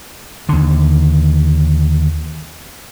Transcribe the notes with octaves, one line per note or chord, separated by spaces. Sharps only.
D#2 D3